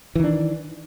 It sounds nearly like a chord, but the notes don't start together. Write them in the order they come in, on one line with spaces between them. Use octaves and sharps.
E3 D#3 D4